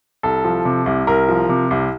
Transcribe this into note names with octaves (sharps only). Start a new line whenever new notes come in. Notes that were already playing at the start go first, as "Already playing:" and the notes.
C2 A4
F3
C3
C2
C2 A#4
F3
C3
C2